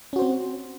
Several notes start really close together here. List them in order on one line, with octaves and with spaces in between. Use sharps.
C#4 F#4 C5 C4